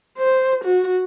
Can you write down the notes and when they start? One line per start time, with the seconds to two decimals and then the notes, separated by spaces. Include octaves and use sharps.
0.18 C5
0.65 F#4